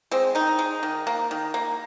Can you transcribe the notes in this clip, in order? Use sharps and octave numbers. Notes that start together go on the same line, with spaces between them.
G#3 C4
D#3 D#4
G#3
D#3
A#3
D#3
A#3